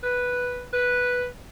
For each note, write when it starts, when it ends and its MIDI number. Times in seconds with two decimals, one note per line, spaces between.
0.03 0.64 71
0.73 1.26 71